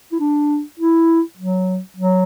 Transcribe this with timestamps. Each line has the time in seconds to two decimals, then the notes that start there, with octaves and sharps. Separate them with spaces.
0.12 E4
0.20 D4
0.79 E4
1.37 F#3
1.97 F#3